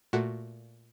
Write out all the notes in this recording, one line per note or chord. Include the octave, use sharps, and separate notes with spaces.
A#2 A3 F#4